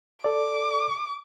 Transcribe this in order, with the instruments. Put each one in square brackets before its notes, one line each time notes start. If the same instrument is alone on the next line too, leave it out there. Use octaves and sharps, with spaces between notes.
[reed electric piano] A4 D5 [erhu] D6